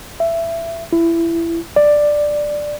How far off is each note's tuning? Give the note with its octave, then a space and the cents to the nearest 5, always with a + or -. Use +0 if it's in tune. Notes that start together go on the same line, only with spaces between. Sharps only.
E5 +20
E4 +20
D5 +5